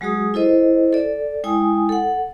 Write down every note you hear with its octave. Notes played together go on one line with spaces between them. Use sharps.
F#3 G#3 F#4 G#4 D#6
E4 A4 C5 D#5
A4 D5
G#3 E4 G5 G#5 D#6
A4 F#5